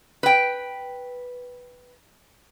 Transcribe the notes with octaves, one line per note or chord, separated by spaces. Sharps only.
B4 G5